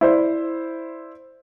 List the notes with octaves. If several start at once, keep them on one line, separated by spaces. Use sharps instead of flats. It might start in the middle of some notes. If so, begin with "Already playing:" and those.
E4 C5 D5